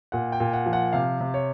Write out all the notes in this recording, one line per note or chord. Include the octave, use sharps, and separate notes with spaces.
A#2 F#5
G5
A#2
F#5
F3
F#5
C3 F5
C3
C#5